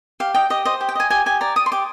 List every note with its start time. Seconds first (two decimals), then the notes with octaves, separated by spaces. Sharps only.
0.20 G4 F5
0.34 D#5 G5
0.50 G4 D#5
0.65 C5 D#5
0.81 G4
0.89 G5
0.95 D#5 G#5
1.10 G4 G#5
1.26 G4 G#5
1.41 D5 A#5
1.56 D5 D#6
1.66 C6
1.72 G4 D6